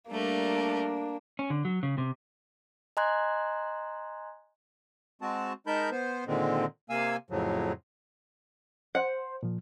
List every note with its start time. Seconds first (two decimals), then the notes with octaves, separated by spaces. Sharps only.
0.11 G3 A3 A#3 D4 A#4
1.39 C#4
1.50 D3
1.65 F#3
1.83 C#3
1.98 C3
2.97 D#5 G#5 A#5 C6 F#6 G#6
5.22 G#3 C4 F#4 A5
5.67 G#3 D#4 A#4 A5 B5 G6
5.91 B3 C5
6.27 A#2 D3 D#3 G#3 C4
6.90 C3 A#3 F5 G#5 E6
7.30 F2 A2 C#3 F3 F#3
8.95 C5 F#5
9.43 A#2 F3